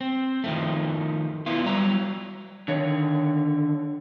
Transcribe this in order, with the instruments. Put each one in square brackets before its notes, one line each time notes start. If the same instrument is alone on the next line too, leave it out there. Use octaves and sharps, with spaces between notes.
[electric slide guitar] C4
D#3 F3 A3
B3 E4 F4
F#3 G3 A#5
D3 D#3 C#5